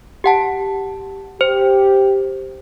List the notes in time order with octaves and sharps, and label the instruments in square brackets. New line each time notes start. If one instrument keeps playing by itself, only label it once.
[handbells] G4 F#5 A5
[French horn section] G4 [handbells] C5